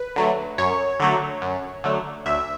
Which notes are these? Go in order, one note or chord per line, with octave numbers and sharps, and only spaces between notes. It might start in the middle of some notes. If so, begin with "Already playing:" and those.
Already playing: B4
D3 F#3 A3
F#2 C#5
D3 F#3 A3
F#2
D3 F#3 A3
D2 E5